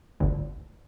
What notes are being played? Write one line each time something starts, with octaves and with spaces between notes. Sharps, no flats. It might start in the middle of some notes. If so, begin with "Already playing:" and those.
G1 D2